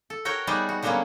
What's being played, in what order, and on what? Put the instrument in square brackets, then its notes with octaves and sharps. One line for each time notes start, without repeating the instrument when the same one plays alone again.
[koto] A4
F#4 A#4 C#5 G5
G3 B3 D#4 G#4 D5 G#5
F#4
D3 F#3 G3 A#3 B3 C#4